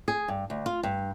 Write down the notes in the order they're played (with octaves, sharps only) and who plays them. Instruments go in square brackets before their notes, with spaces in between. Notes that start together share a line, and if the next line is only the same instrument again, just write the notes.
[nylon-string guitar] G#4
G2
D2
F4
G2